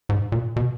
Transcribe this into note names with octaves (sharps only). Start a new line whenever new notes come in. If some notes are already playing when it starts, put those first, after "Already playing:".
G#2
A#2
B2